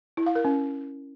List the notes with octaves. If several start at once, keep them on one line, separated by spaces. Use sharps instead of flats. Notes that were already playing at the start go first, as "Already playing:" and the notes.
E4
F5
A#4
C#4